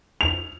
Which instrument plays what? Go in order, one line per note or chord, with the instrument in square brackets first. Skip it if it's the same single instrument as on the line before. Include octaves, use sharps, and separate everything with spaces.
[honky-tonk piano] F7